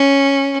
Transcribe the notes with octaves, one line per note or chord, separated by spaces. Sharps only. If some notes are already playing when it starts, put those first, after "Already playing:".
Already playing: C#4